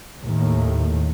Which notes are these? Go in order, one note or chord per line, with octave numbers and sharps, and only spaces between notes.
D#2 A2 D#3